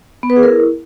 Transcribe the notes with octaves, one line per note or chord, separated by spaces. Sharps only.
B3
B4
G#4
A#4
E4